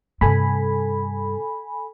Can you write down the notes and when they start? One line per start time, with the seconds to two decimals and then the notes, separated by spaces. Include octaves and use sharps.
0.21 G2 C3 A4 G#5 B5